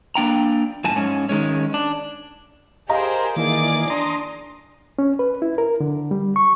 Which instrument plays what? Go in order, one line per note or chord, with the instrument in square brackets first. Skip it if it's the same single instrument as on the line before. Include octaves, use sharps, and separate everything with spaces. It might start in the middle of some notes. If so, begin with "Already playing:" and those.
[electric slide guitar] A#3 D4 G5 A#5
F#2 A2 G#5 A5
G#2 C#4
D#3 G#3 C#4
D4
[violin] G4 [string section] G#4 A#4 C5 [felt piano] D#5 F5 A#5
[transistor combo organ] D#3 E3 A#3 [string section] G#4 D5 [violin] D6
[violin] D4 [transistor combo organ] A#5 C6 D#6
[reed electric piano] C#4
B4
E4
A#4
D3
G3
C#6